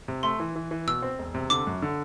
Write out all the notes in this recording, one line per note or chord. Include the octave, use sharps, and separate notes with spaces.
C3
A3 C6
E3
E3
E3
B2 E6
C4
E1
C3
D3 D6
F#2
D3